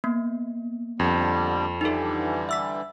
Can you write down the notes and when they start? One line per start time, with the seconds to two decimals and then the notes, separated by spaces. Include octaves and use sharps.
0.04 A#3 B3
1.00 F2 D3 G3
1.81 D3 E3 G3 D#4 A4
2.49 E5 E6 B6